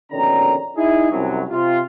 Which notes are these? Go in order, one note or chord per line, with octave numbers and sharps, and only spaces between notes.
A#1 B2 D3 D#3 C#4 A#5
D#4 E4 G#4
C2 F#2 F#3
C3 F4